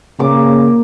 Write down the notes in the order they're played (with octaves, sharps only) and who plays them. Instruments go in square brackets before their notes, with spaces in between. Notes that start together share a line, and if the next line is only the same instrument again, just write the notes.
[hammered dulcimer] A#2 D6 [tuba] C#3